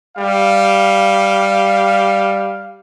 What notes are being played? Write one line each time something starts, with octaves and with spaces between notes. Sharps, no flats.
G3 F5